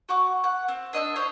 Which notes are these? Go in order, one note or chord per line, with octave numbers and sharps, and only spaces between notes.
F#4 F#5 C#6 D6
F#5
C4
D4 D#5 B5 E6
C5 C#5 D#5